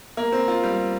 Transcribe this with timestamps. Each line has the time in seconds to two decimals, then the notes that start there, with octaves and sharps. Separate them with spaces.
0.17 A#3
0.32 C4
0.48 F4
0.63 G3